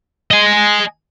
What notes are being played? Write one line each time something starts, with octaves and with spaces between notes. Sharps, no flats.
D#5 G#5